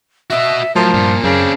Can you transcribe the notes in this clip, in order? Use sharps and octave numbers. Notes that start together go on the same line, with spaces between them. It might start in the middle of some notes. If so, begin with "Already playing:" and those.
F#4 D#5 E5
A2 F3 F#3 A#4
G2 A#2
F#2 C#3 C4 D4